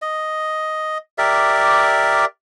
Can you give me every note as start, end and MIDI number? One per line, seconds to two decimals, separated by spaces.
0.02 0.98 75
1.18 2.25 67
1.18 2.25 70
1.18 2.25 74
1.18 2.25 76